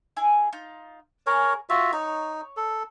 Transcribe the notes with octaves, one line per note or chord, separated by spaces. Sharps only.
E4 G#4 G#5
D#4 F4
G#4 A#4 C#5 A#5
F4 F#4 C#5 E5
D#4 C#5
A4